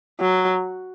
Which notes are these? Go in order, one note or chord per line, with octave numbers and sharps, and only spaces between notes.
F#3